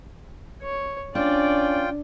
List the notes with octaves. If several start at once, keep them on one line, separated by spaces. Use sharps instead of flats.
C#5
C#4 D4 F4 D5 G5